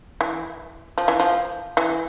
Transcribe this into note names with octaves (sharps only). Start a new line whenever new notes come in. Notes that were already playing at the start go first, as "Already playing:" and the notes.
E3
F3
E3
F3
E3